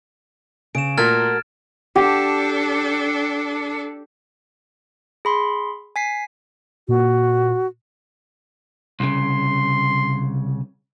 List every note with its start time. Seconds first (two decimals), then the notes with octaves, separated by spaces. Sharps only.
0.75 C#3 D7 E7
0.98 A#2 A3 F#4 A#4 F6 G#6 A6
1.96 D4 G4 A4
5.25 G#4 B5 C6
5.96 G#5 B6 C7
6.88 A#2 F#4
9.00 C2 C#3 C6